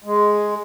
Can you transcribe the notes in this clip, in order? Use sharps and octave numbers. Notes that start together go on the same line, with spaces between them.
G#3